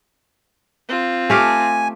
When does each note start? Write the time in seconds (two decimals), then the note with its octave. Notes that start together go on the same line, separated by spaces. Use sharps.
0.88 C4 F4
1.30 A3 G4 F5 G#5